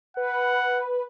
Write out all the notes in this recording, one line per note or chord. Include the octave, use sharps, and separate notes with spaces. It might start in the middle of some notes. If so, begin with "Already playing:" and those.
B4 F#5